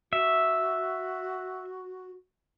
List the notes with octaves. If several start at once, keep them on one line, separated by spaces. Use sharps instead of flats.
F#4 E5